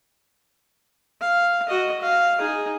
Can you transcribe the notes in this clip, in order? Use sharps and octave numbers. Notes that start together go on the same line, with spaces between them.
F5
F#4 D#5
F5
D#4 G#4